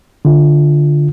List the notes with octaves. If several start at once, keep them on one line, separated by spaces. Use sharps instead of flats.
D3 F4